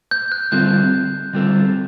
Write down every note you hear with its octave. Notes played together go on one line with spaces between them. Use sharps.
G6
F#6
D3 G3 C4 F4 A4 G6
D3 G3 C4 F4 A4